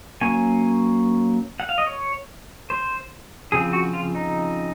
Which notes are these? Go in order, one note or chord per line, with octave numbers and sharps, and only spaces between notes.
F#3 A#3 C#4 G#5
F#5
F5
D#5
C#5
C5
C#3 F3 C4 G#4
F#4
F4
D#4